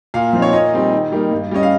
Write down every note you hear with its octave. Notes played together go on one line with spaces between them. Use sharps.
A#2 F5
F3 C4 D#4
C#5
A#2 D#5
G3 C4 D#4
D#3
G3 A#3 D#4
G2
G3 C#4 D#5
F5